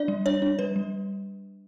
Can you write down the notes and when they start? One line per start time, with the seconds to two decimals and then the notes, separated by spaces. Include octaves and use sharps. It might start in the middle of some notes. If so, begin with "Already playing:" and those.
Already playing: D4 D5
0.08 G3
0.26 D4 C#5
0.42 D4
0.59 G3 B4
0.76 G3